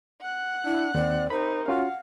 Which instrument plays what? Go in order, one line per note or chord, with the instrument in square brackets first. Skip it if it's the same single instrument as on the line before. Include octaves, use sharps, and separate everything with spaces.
[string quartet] F#5 F#6
[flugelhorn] D4 [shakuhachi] E4
[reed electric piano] D#2 [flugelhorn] C4 [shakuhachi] D5
[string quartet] C3 D#4 [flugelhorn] A#4 [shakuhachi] C5 [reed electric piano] B5
[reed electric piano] C#4 F4 F#4 [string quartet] F5 [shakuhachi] F#5